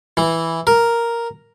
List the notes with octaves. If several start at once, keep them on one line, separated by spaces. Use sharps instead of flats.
E3
A#4